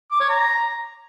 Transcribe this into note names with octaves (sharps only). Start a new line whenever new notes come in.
D6
C#5
A#5